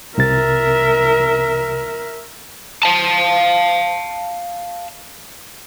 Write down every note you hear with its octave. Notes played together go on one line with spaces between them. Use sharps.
C2 C3 A#4 E5 A6
F5 A5